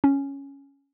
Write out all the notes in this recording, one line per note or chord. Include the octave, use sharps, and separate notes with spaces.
C#4